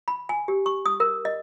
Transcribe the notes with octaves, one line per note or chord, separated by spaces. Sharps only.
B5
G#5
G4
C#6
D#6
A#4
D#5